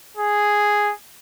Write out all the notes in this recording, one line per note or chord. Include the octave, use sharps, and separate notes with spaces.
G#4